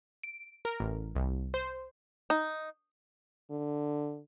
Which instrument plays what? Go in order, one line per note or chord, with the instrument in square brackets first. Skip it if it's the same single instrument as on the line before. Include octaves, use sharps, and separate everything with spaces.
[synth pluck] D7
A#4
A1
C2
C5
[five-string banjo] D#4
[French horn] D3